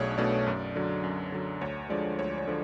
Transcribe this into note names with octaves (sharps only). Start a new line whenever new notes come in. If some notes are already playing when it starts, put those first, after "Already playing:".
Already playing: B1 B2 A3 D4 G#4 C#5
B2 A3 D4 D5
F#2
D3 F#3
F#2
D3 F#3
D2 C#5
D3 F3 G#3 D5
D2 C#5
C#5
D3 F3